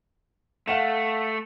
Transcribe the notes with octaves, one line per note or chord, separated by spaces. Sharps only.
A3 F5 F#5 E7